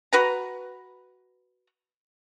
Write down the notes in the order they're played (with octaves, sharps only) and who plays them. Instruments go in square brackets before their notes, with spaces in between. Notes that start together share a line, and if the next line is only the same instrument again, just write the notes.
[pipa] F#4 B4 A#5